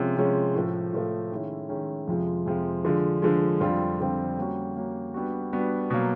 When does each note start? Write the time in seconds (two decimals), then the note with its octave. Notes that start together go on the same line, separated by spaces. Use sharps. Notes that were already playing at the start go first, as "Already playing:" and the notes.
Already playing: C3 F3 G#3 C#4
0.17 C3 F3 G#3 C#4
0.55 A2 F3 A3
0.93 A2 F3 A3
1.32 D#3 G#3 C#4 E4
1.69 D#3 G#3 C#4 E4
2.08 F2 C3 F3 G#3
2.46 F2 C3 F3 G#3
2.85 D3 F3 G#3
3.22 D3 F3 G#3
3.60 F2 D3 G3 C4 F4
3.99 F2 D3 G3 C4 F4
4.37 G3 A#3 C#4 F#4
4.75 G3 A#3 C#4 F#4
5.14 G3 B3 D4 F#4
5.53 G3 B3 D4 F#4
5.90 B2 F#3 A#3